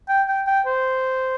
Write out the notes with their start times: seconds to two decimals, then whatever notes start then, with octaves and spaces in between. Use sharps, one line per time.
0.09 G5
0.28 G5
0.47 G5
0.66 C5